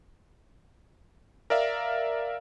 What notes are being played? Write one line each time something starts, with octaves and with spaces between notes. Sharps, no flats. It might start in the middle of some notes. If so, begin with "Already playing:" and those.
A#4 D5 E5 F5